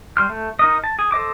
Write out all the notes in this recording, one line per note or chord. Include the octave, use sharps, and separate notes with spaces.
G3 C6 F6
A3
D#4 A#4 D#5
A5
G#4
A4 C5 D#5 D6